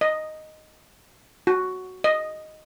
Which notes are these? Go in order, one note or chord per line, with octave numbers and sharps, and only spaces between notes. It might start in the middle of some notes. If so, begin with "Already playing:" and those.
D#5
F#4
D#5